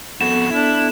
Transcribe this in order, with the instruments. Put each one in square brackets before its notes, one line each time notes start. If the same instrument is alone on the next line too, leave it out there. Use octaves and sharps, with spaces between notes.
[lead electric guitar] F2 F#4 [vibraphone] B3 A4 [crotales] E7
[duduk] D4 [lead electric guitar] E4